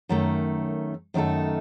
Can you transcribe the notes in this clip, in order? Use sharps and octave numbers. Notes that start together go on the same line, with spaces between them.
F#2 D#3 A3
F#2 D#3 A3 D#4 A4